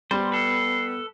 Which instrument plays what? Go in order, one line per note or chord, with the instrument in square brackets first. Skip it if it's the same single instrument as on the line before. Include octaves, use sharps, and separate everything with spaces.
[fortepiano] G3 [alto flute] B3 [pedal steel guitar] C5 [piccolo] C6
[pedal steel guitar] A4 B4 [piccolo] C7